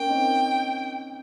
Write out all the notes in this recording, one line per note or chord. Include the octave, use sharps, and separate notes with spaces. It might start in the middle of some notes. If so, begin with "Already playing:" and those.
Already playing: A#3 C#4 G5
C4 D#4